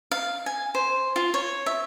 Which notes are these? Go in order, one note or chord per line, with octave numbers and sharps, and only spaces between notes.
F5
G#5
C5
F4
C#5
E5